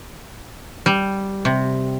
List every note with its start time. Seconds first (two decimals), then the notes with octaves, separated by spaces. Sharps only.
0.86 G3
1.45 C3